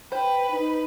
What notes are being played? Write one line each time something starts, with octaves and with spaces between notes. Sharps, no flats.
B4 C5 G5
D#4